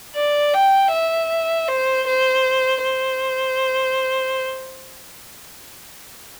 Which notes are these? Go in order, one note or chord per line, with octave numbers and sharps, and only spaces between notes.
D5
G5
E5
C5
C5
C5